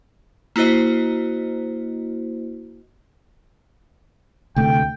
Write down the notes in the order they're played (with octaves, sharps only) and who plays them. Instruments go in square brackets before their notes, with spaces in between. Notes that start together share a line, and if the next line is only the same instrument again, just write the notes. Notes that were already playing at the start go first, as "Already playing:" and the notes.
[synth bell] A#3 E4 F#4 C5 D#5
[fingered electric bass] D2 C3 A3 [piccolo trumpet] G5